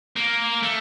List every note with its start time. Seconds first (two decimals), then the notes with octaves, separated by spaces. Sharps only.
0.16 A#3
0.63 A3